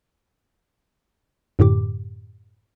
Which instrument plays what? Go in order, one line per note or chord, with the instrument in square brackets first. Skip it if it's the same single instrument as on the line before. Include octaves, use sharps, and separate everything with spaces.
[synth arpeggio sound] F#2 A2 D3 G4 D6